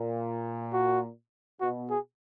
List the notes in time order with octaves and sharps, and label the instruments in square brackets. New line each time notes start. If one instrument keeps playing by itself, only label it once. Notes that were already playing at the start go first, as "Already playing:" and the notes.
Already playing: [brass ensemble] A#2
[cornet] F#4
[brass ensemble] B2 [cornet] F#4
[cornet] G#4